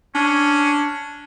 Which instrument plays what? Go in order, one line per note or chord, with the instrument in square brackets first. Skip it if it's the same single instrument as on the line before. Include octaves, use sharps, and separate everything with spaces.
[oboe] C#4 [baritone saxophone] D4